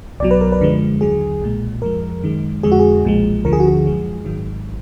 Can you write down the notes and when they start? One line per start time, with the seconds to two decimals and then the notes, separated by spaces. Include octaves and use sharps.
0.20 B1 B2 F#3 D5
0.31 B4
0.41 A#4
0.52 B4
0.61 F#2 D3 F3 G#3
1.01 D#2 D3 F#3 G#4
1.42 B1 A#2 G#3
1.82 F2 F3 G#3 A#4
2.24 F#2 D#3 G#3
2.63 F2 D3 G#3 G#4
2.72 F#4
2.79 G#4
3.04 B1 A#2 F3 G#3
3.45 D2 D3 F3 A#4
3.53 G#4
3.60 F#4
3.68 G#4
3.85 F#2 F3 G#3
4.25 G#1 G#2 D#3 F#3